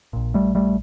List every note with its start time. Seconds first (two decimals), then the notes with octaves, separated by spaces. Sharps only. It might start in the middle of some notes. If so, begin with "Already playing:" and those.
0.13 A#1 A#2
0.34 G3 A3
0.55 G3 A3